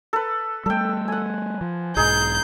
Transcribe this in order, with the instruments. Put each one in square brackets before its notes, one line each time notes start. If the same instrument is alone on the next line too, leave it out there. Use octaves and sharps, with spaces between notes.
[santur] A4 B4
[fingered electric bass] G3 A3 [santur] A4 G5
[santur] F#5 G#5
[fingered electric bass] F3
[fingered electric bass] B1 G#2 [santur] D#4 G#4 [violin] G6